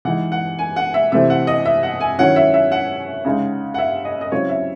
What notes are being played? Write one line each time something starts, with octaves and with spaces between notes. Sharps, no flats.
E3 G#3 D#4 F#5
F#5
G#5
F#5
E5
C3 E3 A3 C4 E4 E5
F#5
D#5
E5
F#5
G#5
D#3 F#3 C#4 E4 F#5
E5
E5
F#5
C#3 G#3 D#4
F#5
E5
D#5
D#5
C#3 F#3 C4 E4 C#5
E5